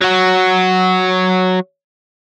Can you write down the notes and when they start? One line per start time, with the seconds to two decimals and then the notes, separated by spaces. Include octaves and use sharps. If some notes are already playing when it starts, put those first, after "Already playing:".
0.02 F#3 F#4